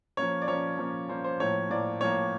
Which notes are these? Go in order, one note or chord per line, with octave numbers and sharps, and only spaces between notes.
F3 A#3 C#4 C#5
D5
F3 A#3 C#4 C#5
F3 A#3 C#4
F3 A#3 C#4 C5
C5
A2 F3 A#3 C#5
A2 F3 A#3 D5
A2 F3 A#3 C#5